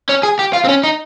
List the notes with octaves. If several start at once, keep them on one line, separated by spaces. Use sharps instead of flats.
C#4
G#4
G4
F4
C4
C#4
D#4